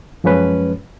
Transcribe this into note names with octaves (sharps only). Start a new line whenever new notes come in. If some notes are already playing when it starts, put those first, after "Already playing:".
F#2 F3 G#3 C#4 B4